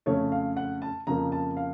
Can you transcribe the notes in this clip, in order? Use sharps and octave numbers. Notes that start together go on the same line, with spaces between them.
F2 C#3 A3 C#5
F5
F#5
A5
F2 C#3 F3 A#3 A#5
A5
F5